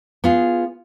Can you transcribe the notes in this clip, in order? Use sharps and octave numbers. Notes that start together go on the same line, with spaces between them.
B3 F4 G#4